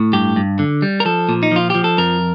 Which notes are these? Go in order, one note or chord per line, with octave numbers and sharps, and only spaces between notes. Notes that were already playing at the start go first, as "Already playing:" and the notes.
Already playing: A2
G2 G4
G2
D3
G3
A#4
F3 A4
A#2
D#4
F3 F4
F3 G4
A4
F2 A#4